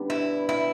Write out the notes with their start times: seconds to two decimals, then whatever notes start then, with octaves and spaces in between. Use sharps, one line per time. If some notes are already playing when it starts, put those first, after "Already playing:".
Already playing: G2 D3 G3 B3
0.10 E4
0.49 E4